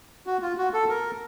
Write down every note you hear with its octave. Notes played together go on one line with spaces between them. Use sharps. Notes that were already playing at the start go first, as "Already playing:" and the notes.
F#4
F4
F#4
A4
A#4